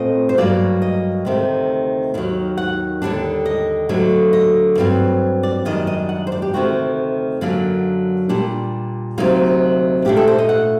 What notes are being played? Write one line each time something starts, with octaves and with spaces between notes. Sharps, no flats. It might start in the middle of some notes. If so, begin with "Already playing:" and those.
Already playing: A#2 A3 C4 D#5
C5
G2 F#3 A#3 D5
D#5
D2 C3 D#3 A3
D#2 D#3 F#3
F#5
D#2 D3 G3 D4
D#5
D2 D3 F#3
D#5
G2 F#3 C4
D5
F#2 D#3 G3 D4 D#5
D#5
F#5
C5
D5
G4
D2 C3 D#3 A3 F#4
F#2 D3 F#3 A#3 D4
A#2 G3 D4
D2 C3 F#3 A#3 D#4
A#2 A3 D4 G4
A4
C5
D#5
F#5